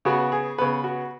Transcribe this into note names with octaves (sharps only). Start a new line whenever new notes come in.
C#3 B3 F#4
G#4
C#3 B3 B4
F#4